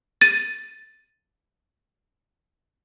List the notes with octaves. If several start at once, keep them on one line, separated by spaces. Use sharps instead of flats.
A6 D#7